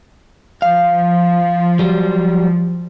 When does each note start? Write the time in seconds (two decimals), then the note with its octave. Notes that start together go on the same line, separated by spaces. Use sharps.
0.62 F3 F5
1.79 F#3 G3